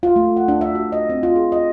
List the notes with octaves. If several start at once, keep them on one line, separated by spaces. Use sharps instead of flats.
F4
A3
F#5
D4
E5
F#4
D#5
C4
F4
G#4
D#5